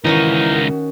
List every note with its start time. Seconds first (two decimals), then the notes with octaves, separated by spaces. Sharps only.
0.04 C#2 D#3 E3 C#4 D#4 F#4 A#4